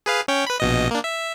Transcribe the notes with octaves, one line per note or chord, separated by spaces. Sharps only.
G#4 B4 F5
C#4 C#5 G5
B4 B5
A#1 B2 D#5
A#3 D4
E5